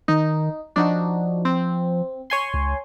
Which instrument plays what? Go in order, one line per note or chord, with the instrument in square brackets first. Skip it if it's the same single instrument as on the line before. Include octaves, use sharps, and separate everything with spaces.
[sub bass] D#3 [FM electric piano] D#4
[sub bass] F3 [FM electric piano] D4 D#4 F#4
[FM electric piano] C4
C#5 G#5 C6
[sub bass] C#2